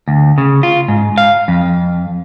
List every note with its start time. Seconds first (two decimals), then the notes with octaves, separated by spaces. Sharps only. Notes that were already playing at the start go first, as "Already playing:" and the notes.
0.08 D2
0.38 C#3
0.63 F4
0.88 G#2
1.18 F5
1.48 F2